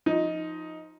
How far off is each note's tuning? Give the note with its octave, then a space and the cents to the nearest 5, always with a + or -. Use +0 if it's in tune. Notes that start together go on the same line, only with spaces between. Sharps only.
F3 +0 D#4 +10